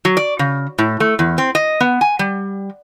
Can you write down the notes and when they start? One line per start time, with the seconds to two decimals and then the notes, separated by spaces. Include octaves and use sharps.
0.05 F#3
0.17 D5
0.39 C#3
0.78 A2
1.00 A3
1.19 E2
1.38 C4
1.55 D#5
1.80 B3
2.01 G#5
2.19 G3